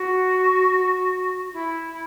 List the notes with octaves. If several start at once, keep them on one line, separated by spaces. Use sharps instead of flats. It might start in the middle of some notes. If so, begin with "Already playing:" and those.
Already playing: F#4
E4